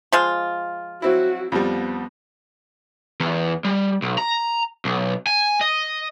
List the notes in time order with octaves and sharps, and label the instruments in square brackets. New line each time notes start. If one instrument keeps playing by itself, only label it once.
[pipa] F3 G#3 F4
[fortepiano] F#3 C4 E4 [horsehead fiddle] F#4
[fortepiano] F2 F3 G3 [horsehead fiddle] B3
[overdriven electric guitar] E2
G3
B1
A#5
B1
G#5
D#5